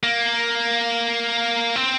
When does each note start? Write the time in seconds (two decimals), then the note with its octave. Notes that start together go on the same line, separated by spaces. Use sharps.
0.03 A#3
1.76 C4